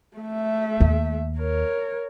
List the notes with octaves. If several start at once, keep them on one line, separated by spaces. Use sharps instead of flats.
A3 E5
D#2
A#4 C#5